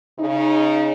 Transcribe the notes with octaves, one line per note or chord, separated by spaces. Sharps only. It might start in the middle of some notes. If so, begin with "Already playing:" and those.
C#3 D#4